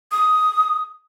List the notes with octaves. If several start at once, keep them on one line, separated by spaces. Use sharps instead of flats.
D#6